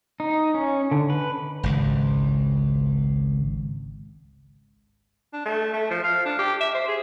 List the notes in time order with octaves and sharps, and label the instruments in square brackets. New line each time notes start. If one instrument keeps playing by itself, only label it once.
[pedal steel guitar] D#4
C#4
D3
B4
[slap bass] G#1 C#2
[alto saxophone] D4
A3
A3
F3
F5
D4
G4
E5
C5
G#4